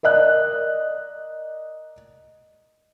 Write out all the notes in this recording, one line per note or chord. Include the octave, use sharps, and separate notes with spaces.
A#4 D5 D#5 F#6